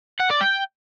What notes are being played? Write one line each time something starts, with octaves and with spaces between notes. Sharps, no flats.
F#5
D5
G5